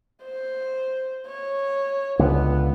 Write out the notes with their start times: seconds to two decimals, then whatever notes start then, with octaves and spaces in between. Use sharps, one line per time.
0.23 C5
1.27 C#5
2.19 C#2 D3 B3